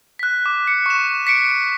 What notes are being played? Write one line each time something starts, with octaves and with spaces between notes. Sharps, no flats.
F#6 B6
D6
C#7
C#6 E7
B6 C#7 D7